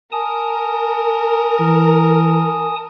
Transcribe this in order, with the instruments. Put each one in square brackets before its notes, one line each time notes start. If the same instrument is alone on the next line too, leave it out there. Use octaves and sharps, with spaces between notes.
[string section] A#4 [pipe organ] G#5 A5 D#6
[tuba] E3